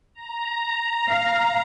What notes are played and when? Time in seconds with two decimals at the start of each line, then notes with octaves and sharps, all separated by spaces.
0.14 A#5
1.10 F5